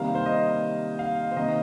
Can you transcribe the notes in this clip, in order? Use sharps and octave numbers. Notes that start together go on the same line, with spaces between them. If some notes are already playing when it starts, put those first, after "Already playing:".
Already playing: C3 D#3 G3 A#3 F5
C5
D#5
F5
C5
C3 D#3 A#3 D#5